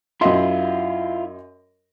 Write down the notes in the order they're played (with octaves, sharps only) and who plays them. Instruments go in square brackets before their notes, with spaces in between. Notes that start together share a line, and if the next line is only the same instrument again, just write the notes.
[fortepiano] F#2 D#5 C6 [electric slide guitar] E4 F4 E5